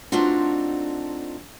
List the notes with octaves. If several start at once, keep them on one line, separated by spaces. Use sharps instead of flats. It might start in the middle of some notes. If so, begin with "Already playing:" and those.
A3 C4 D4 D#4 F4 F#4